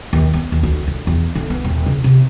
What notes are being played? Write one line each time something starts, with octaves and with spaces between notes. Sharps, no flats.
D#2
B3
D#2
D2
D3
E2
D3
B3
D#1
C#3
C3